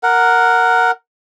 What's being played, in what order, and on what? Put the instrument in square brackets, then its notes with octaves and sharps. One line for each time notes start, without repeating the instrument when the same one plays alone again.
[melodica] A#4 F#5